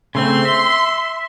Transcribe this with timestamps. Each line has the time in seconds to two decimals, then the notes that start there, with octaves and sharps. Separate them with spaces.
0.15 C#3 A3 C4 C6
0.45 E5